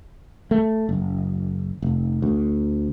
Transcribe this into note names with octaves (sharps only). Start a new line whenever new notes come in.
A3
F#1
F1
D2